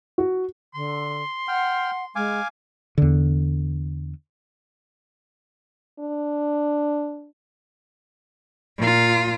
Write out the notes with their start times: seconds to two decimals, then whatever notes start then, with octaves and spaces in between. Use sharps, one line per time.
0.18 F#4
0.74 D3 C6
1.48 F#5 G5 F6
2.16 G#3 F5 G#5 D6
2.98 E2 D3
6.00 D4
8.78 A#2 F4